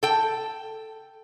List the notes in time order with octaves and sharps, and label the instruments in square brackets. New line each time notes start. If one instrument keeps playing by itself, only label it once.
[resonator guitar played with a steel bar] A4 G5